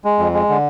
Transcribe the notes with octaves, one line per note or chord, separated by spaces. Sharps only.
G#3
F2
G#3
D3